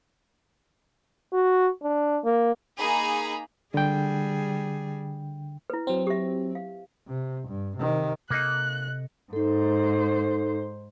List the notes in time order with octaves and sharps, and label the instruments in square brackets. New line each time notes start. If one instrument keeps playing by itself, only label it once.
[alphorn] F#4
D4
A#3
[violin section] A#3 D#4 G#4 A#5 B5
[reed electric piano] D3 G5 [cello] G3 G#4
[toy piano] E4 B4
[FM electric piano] F#3 C4
[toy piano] G4 E5
F5
[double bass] C3
G2
C3 D#3
[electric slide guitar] C3 A4 D#5 [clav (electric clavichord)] A#3 D#4 [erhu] F#6
[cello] G#2 C5 [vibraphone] D#4 A4